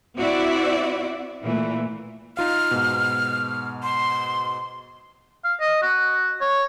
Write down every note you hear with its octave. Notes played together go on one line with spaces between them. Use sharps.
C4 E4 F#4 D5 E5
A#2 E3 A3
D#4 F4 F5 F6
G#2 B2
C6
F5
D#5
F#4
C#5